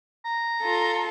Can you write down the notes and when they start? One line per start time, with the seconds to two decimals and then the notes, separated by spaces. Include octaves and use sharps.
0.25 A#5
0.61 F4 A4